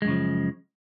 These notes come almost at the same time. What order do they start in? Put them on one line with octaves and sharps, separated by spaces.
G#3 F#2 C#3 F3